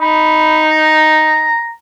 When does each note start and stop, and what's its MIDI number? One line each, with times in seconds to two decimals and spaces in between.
0.01 1.52 63
0.01 0.64 83
0.69 1.72 82